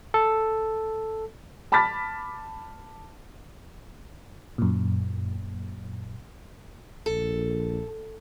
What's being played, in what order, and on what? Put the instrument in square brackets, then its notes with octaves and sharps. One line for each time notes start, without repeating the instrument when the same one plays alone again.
[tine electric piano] A4
[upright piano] A5 B5 D6 F6 A6 B6
[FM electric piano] F#2 A#2
[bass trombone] A#1 [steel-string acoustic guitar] A4